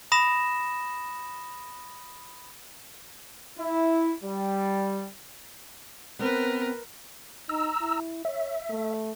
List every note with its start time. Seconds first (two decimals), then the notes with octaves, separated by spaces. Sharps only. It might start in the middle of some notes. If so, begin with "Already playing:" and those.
0.12 B5 D#6 A#6 E7
3.58 E4
4.23 G3
6.19 B3 C4 A#4 B4
7.49 D#4 A#5 E6
7.81 E4
8.25 C#5 E5
8.70 A3